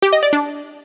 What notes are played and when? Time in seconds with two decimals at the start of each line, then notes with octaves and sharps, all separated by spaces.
0.02 G4
0.13 D#5
0.23 D5
0.33 D4